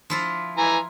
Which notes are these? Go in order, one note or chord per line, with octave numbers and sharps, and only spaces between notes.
F3 E4 F4
E3 G#5 A#5